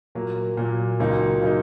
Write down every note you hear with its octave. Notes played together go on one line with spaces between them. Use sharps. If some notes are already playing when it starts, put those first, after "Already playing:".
A#2 F#3 A#3
A#2 F#3 A#3
C#2 C#3 F#3 A#3 D#4
C#3 F#3 A#3 D#4